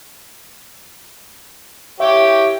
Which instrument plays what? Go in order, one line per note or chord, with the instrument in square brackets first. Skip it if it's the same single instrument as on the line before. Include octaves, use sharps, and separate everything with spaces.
[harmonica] G4 C#5 G5 [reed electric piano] E5